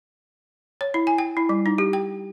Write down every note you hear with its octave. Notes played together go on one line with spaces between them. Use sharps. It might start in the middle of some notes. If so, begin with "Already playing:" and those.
C#5
E4
G#5
G5
E4
G3
D#4
G4
G5